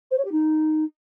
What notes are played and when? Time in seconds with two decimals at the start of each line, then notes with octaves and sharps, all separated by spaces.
0.10 C5
0.17 C#5
0.24 G4
0.31 D#4